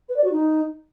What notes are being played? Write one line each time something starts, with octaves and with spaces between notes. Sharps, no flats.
B4
D5
F#4
D#4